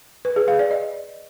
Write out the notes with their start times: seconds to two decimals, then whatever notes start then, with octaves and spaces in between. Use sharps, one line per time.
0.25 B4
0.36 G#4
0.48 F5
0.59 D5
0.71 D#5